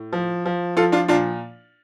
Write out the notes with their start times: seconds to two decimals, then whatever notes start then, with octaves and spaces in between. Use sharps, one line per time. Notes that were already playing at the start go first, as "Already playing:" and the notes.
Already playing: A2
0.13 F3
0.45 F3
0.76 F3 F4 A4
0.92 D4 F4
1.08 A#2 D4 F4